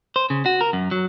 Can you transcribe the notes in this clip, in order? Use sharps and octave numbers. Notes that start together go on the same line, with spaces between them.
C5
C#3
F#4
A#4
F#2
F#3